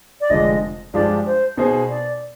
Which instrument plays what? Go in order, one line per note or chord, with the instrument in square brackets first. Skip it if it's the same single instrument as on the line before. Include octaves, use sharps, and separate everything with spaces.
[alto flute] D5
[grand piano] F1 F2 D3 F3 G#3 [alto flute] D#5
[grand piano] G2 F3 G#3 D4 G4 [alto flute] D5
[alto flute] C5
[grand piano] B2 B3 D#4 G#4 C5
[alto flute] D5